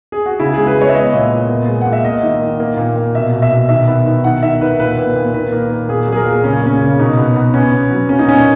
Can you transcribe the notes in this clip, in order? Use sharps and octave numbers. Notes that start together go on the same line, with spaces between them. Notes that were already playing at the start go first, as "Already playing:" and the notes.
G#4
F#4
C#3 E4
G#3 G#4
B4
G#3
C#5
E5
B3 D#5
A#2
A#2
B3
G#3
F#5
A#2
E5
A#3 D#5
D#3
D#3
A#3
A#2
A#2
B2 E5
B2
E5
B2
D#3 E5
B3
D#3
D#3 F#5
D#3 E5
D#3 B4
A#2 B4
A#2
A#2
D#3 B4
A#3
A#3
A#2 G#4
F#3
G#4
A#4
A#2
C#3 C#4
A#3 C#4
C#3
B2 D#4
B3
B3
B3 C#4
B3
F#3
A#3 C#4
D#4
A#2 C#4